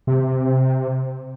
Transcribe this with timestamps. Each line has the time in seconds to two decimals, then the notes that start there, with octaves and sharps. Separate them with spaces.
0.07 C3